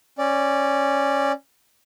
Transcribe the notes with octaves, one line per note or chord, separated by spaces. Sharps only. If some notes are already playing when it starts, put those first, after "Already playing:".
C#4 D5